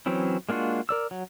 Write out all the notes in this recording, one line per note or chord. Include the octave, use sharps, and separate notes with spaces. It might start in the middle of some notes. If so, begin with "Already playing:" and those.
E3 F#3 C4 C#4 E4
G#3 A#3 D4 F4 F#4
A#4 D5 E6
F#3